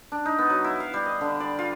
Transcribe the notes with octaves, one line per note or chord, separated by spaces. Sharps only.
D4
D#4
B3
F#3
E4
F5
G3
D#5
D3
D5
F4